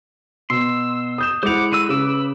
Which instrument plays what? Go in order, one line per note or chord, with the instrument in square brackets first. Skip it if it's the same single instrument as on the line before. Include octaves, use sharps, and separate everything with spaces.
[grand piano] B2 [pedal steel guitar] C6 [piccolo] E6
[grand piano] D#6 G6 E7
[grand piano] G#3 E4 F7 [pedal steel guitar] C5 F#5 [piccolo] D6
[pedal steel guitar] D3 F#4 E6 [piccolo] D#7
[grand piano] C#3 [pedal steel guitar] B4 D6 [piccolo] E6